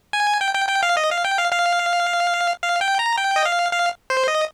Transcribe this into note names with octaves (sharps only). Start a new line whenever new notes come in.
G#5
G5
G5
G5
F5
D#5
F5
G5
F5
F5
F5
G5
A#5
G5
D#5
F5
F5
C5
D#5